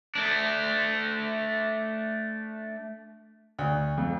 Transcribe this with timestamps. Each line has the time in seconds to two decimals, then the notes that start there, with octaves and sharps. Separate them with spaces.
0.15 A3 D4
3.59 D2
3.98 F2